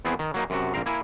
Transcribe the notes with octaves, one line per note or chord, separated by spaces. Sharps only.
E2 B3 C4 E4 G#4
D#3
F#3 A#3 D#4
F#2 C3 F#4
A#1 C4 A#4 F5
A#3 E4 G#5